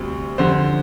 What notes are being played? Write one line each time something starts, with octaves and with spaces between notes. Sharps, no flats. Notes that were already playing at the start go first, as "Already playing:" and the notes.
Already playing: D2 C3 G3 C4
F2 D3 G3 C5